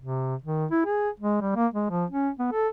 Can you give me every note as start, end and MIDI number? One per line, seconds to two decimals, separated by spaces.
0.01 0.35 48
0.42 0.66 51
0.71 0.81 64
0.86 1.10 68
1.20 1.41 56
1.42 1.53 55
1.56 1.67 58
1.74 1.88 56
1.90 2.05 53
2.11 2.30 61
2.39 2.49 59
2.52 2.68 69